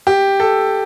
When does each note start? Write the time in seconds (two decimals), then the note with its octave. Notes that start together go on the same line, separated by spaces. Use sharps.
0.07 G4
0.40 A4